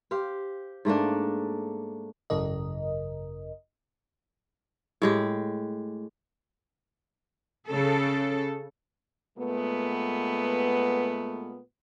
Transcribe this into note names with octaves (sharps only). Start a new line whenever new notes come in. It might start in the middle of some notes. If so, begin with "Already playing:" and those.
G4 C5 F5
G#2 A3 A#3 D4
G#1 F#2 C#3 A#4 D#5
A2 G#3 G4
C#3 A4
A#2 G#3 A3 B3